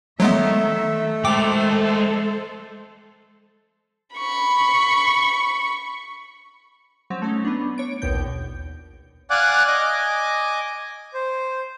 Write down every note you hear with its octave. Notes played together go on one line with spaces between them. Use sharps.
D#3 F#3 G#3 A3 B3 E5
G#3 A4 C5 G5 D6
B5 C#6
F#3 C4 C#4
A3 C#4 D#4
B3 D4
C#5 D7
A#1 D#2 B2 G6
D5 F5 F#5 G#5 D6 F#6
D#5 G#5 D6
C5